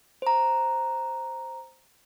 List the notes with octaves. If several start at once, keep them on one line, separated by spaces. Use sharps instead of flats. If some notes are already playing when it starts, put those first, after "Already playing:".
C5 A#5